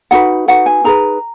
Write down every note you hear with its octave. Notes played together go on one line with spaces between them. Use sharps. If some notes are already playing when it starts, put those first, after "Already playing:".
D#4 F#4 B4 F#5
D#4 F#4 B4 F#5
G#5
D#4 G#4 B4 A#5